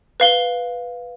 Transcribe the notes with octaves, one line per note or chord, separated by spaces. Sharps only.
B4 F5 G7